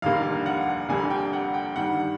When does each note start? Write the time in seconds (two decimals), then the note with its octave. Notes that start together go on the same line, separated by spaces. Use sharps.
0.02 F1 D#2 D3 G3 A#3 F5
0.46 F#5
0.89 F1 F2 D3 G3 A#3 G#5
1.10 G5
1.33 F#5
1.54 G5
1.76 G2 D#3 G3 F#5